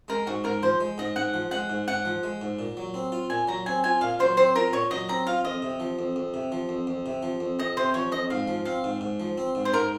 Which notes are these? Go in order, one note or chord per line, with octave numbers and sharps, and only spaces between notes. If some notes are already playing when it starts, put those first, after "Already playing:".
G#3 A#4
G#2 F#4
G#2 A#4
F3 C5
G#3
G#2 D#5
G#2 F#5
F3
G#3 F#5
G#2
G#2 F#5
F3
G#3
G#2
A#2
F#3
C4
F4
A#2 G#5
F#3 A#5
C4 G#5
F4 G#5
A#2 F5
F#3 C5
C4 C5
F4 A#4
A#2 C#5
F#3 D#5
C4 A#5
F4 F5
F2 D#5
C3
F3
F2
F2
C3
F3
F2
F2
C3
F3
F2
F2 D#5
C3 C5
F3 C#5
F2 D#5
G#2 F5
F3
C4 F5
G#2
G#2
F3
C4
G#2
C5
G#2 A#4